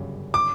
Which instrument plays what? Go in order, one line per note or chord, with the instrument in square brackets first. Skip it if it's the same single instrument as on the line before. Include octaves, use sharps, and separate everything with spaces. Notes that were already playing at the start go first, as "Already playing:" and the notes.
Already playing: [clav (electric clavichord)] G1 F#2 C#3 G3
[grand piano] D6